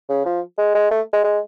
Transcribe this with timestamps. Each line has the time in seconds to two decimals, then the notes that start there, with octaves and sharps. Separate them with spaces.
0.09 C#3
0.26 F3
0.58 G#3
0.75 G#3
0.91 A3
1.13 G#3
1.24 G#3